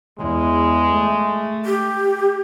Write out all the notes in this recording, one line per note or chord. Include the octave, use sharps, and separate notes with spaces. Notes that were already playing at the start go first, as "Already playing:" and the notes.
E2 G#3
A3
G4